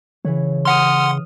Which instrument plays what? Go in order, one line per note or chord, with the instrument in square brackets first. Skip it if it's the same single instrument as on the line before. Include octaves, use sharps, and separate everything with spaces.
[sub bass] C#3 [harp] E3 B4 C#5
[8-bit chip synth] F#5 C6 [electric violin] D#6 F6